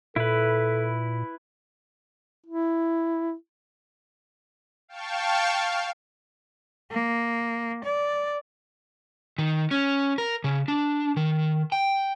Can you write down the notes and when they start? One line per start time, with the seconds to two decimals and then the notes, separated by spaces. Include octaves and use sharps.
0.16 A#2 E4 A4 B4
2.46 E4
4.88 F5 G5 A5 C#6
5.54 F5
6.91 A#3
7.84 D5
9.38 D#3
9.71 C#4
10.18 A#4
10.44 C#3
10.68 D4
11.17 D#3
11.72 G5